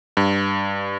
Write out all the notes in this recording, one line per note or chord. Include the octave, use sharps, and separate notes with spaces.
G2